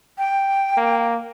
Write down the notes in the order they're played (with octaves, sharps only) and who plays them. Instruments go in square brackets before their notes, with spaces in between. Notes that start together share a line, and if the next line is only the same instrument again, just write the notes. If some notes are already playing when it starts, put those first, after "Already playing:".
[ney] G5
[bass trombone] A#3